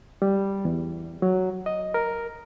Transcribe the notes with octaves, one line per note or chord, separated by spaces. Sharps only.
G3
E2
F#3
D#5
A#4